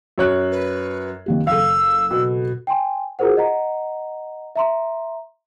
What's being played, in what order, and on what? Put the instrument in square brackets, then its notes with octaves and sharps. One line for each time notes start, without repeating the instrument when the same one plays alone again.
[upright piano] F#2 C#5 F#6
[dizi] B4
[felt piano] D#3 A#3 G4
[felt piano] F#1 A4 [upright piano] F5 [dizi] E6
[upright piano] B2
[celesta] G5 G#5 C6
F4 F#4 G#4 A#4 C5 F#5
D#5 F#5 A#5
E5 A#5 C6